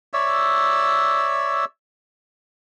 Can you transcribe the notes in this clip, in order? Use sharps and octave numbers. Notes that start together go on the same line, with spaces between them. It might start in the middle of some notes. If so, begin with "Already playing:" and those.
C#5 D5 E5 E6